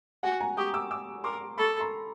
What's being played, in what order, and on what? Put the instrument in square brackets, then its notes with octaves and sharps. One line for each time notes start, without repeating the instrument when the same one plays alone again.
[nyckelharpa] F#4 [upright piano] F#5 G#5
[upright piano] G#5 A#5
[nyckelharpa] G4 [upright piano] C#6 D#6
[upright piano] D6 E6
D6 E6
[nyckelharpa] A#4 [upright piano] C6 D6
[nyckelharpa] A4 [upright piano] B5 C#6
[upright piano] A#5 C6